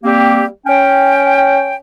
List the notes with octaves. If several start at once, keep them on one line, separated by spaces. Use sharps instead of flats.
G3 A#3 C4 G4
C#4 G5